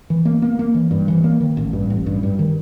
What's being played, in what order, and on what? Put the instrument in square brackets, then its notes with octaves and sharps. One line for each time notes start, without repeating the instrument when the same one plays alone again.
[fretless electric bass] E3
A#3
A#3
A#3
E3
G2
E3
A#3
D#3
A1
G2
A1
G2
G2
D#3